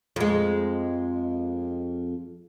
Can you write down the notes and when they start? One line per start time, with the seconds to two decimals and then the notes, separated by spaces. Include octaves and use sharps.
0.16 F2 G#3